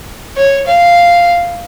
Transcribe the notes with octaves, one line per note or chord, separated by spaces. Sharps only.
C#5
F5